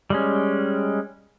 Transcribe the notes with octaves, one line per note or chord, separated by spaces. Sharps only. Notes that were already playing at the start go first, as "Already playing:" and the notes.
G3 G#3 C#4